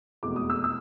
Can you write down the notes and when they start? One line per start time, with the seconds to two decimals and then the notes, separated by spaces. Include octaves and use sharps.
0.23 F1 E2 B2 G#3 D6
0.36 D#6
0.50 E6
0.64 E6